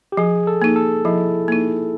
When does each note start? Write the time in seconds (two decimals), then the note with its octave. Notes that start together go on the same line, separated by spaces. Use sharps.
0.12 G4
0.17 F3 G#4
0.47 A4
0.62 A#3 D#4
0.76 A4
1.05 F3 E4
1.48 A#3 D#4